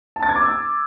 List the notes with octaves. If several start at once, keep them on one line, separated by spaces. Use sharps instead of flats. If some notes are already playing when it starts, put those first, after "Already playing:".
A5
A6
G#6
D6
E6